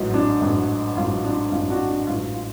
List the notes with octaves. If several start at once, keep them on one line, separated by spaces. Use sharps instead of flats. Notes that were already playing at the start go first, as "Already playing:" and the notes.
Already playing: A1 G#2 F#3
D4
A1 G#2 F#3
A1 G#2 F#3 F4
D4
A1 G#2 F#3 F4
D4 F#4
D4
A1 G#2 F#3 F4
F4